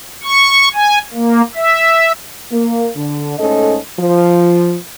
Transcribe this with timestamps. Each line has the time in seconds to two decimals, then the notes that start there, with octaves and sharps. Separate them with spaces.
0.24 C#6
0.74 G#5
1.14 A#3
1.55 E5
2.52 A#3
2.96 D3
3.39 G#2 A3 C#4 A4 D#5
3.99 F3